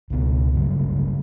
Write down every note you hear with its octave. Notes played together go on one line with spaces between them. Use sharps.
C#2 B2 B3
G2 C#3 F#3